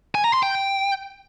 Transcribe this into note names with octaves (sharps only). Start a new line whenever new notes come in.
G#5
A#5
C6
G5